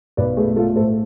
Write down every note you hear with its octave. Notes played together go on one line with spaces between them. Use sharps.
B1 B4 D5
A3 G#4 B4
A3 F4 A4
A2 A4 C5